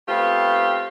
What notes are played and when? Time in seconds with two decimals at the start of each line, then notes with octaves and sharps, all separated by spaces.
0.08 A3 B3 C4 F4 G4